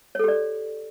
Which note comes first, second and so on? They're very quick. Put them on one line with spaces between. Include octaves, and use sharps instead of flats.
C#5 A4 G4 D5